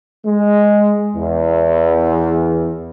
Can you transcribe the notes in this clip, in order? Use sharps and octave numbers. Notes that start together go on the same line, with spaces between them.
G#3
E2